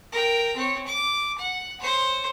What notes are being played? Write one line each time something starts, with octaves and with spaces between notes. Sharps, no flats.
A#4 G5
C4 C#5
D6
F#5
C5 C#5